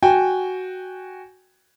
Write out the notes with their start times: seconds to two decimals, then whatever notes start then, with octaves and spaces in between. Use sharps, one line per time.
0.03 F#4 G5 G#5